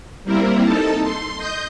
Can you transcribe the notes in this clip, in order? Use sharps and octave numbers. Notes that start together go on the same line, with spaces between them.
G3 A#3 C4 E4 A#4
D#4 A4 A5
C6
D#5 G6